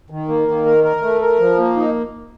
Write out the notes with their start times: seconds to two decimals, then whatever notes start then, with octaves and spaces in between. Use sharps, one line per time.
0.10 D#3
0.28 A#3
0.48 D#3
0.65 A#4
0.84 A#4
1.02 A3
1.21 A#4
1.39 F3
1.58 A#3
1.76 D#4